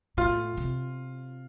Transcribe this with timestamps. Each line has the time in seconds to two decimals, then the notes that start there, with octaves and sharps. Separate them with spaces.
0.17 A2 F4
0.57 C3